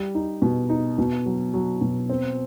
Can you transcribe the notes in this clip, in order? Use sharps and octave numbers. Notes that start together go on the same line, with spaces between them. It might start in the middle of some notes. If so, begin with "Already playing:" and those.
Already playing: G3
D#4
B2
D#4
B2
F#3
F#3
B2
C4